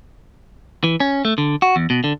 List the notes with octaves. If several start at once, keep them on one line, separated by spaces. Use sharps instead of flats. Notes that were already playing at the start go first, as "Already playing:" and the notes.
E3
C#4
A3
D3
F#4
E2
B2
D3